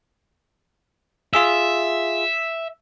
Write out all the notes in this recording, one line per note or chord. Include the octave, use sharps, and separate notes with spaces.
F4 G#4 E5 E6